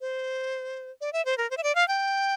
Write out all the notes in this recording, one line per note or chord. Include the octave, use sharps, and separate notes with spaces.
C5
D5
E5
C5
A#4
C5
E5
D5
F5
G5